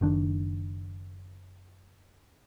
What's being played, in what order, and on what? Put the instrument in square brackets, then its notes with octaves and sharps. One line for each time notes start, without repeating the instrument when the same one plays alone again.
[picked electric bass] F#1 D#3 D4